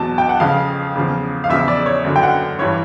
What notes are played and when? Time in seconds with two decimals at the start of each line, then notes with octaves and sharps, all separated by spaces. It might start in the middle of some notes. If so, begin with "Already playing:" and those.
Already playing: E2 B2 F#3 A5
0.18 G5
0.29 F#5
0.40 F2 C#3 F3 F5
0.95 E2 C#3 F3
1.44 F5
1.49 E2 C#3 F3 E5
1.68 D5
1.86 C#5
2.04 F#2 D3 F#3
2.16 G5
2.23 F#5
2.59 G2 E3 G3 C#5